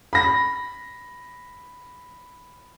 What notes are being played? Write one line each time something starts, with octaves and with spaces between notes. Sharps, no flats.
B5 A#6